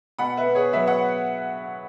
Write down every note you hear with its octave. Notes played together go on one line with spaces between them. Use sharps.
B2 F#5 B5
B4 E5
B2
G#4 C#5
F#3 B4 E5
C#5 F#5